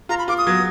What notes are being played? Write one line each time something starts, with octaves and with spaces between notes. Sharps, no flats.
F4 A#5
B5
F4 D6
D#6
F#3